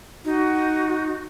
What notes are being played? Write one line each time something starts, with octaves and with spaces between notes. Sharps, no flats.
D#4 F#4